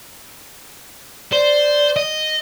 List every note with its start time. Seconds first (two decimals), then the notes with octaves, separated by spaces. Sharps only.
1.32 C5 D5
1.96 D#5